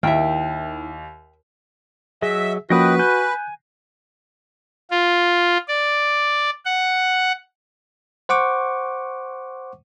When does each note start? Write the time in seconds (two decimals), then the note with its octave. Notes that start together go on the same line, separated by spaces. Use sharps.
0.03 D#2 D#3 E4 E5 G5
2.22 F#3 G#4 D#5 E5
2.70 F3 A#3 C#4 F#4 B4 D#5 G5 D#6
2.99 G#5 F#6 G6
4.91 F4
5.68 D5
6.65 F#5
8.29 C5 F#5 C#6 D6